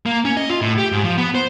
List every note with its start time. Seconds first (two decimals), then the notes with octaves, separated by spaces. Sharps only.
0.06 A#3
0.25 C#4
0.37 D#5
0.50 F4
0.61 A2
0.78 G4
0.92 G#2
1.04 F3
1.18 B3
1.35 C5